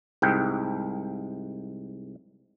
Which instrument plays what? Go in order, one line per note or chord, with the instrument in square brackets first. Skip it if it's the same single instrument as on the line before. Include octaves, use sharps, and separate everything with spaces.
[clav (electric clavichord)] C2 G#2 G5